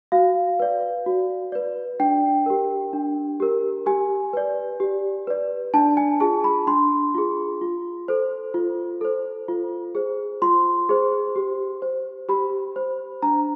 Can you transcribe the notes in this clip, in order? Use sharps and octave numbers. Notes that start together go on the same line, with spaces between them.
F#4 F5
B4 D5
F#4
B4 D5
D4 G5
G4 A#4
D4
G4 A#4
G4 G#5
B4 D5
G4
B4 D5
D4 A5
G#5
F4 G#4 A5
B5
D4 C6
F4 G#4
F4
A4 C5
F4
A4 C5
F4
G#4 C5
F4 C6
G#4 C5
G4
C5
G4 B5
C5
D4 A#5